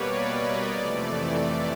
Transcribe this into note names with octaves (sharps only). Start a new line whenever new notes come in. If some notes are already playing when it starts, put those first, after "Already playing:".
Already playing: B2 G3 A#3 B4 C#5 D5
D#5
F2 C3 E3 A3 D5